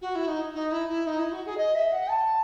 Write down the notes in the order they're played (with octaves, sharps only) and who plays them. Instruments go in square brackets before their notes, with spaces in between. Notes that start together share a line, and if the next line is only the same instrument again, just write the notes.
[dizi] F#4
E4
D#4
D#4
E4
E4
D#4
E4
F#4
G#4
D#5
E5
F#5
A5